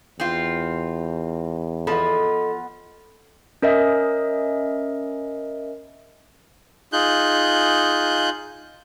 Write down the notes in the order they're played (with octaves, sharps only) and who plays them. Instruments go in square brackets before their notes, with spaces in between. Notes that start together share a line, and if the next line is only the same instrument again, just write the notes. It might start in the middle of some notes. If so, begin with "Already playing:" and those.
[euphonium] E2 [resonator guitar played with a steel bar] C4 F4
[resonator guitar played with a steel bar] F3 [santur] B3 B5 [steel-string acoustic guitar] A4 D#5
[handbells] C#4 A#4 D#5 E5
[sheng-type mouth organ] D#4 F4 G#4 F#6 G6